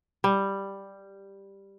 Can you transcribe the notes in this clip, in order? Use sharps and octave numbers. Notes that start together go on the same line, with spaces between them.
G3